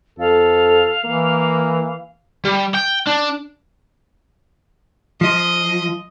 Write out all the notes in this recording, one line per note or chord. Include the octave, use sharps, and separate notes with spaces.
F2 A4 F5
E3 A#3
G3
G5
D4
F3 D#5